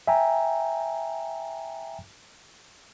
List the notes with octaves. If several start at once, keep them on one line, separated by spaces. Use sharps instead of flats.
E5 G5 G#5 A#5